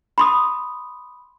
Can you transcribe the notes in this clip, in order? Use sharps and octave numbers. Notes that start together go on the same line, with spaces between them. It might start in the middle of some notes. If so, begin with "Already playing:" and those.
B5 C6 D#6